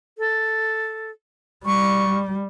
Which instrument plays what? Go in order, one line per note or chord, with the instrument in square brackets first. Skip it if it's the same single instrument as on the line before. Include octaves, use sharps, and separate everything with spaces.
[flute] A4
[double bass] G3 [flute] C#6